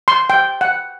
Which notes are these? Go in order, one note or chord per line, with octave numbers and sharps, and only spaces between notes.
C6
G5
F#5